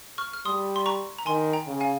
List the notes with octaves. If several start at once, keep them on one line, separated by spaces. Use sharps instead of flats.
C#6 F6
F6
G3 C6 D#6
C6
A#5 C#6
A#5
D#3 G#5 C6
G5 A#5
C#3
F5 G#5